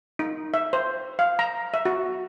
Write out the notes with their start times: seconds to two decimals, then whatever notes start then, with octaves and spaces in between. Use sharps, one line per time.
0.19 D#4
0.54 E5
0.73 C5
1.19 F5
1.39 A#5
1.74 E5
1.85 F#4